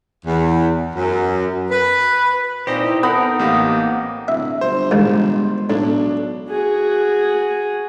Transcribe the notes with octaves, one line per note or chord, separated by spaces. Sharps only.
E2
F#2
B4
A#2 C4 D#4 G4 C5 D#5
E4
B3 C4 D#4 A4 A#4 B5 F#6
A1 A3 A#3 G4
D1 E5
G1 C5
G#2 D#3 G#3
B1 A2 D4
F#4 G#4